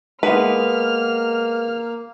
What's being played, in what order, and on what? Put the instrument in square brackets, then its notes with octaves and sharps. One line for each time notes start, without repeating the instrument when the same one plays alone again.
[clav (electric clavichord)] G#3 B3 [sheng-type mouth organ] A#3 [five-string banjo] B4 [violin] F6